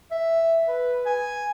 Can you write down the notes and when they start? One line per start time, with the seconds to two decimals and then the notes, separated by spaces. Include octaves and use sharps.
0.11 E5
0.68 B4
1.06 G#5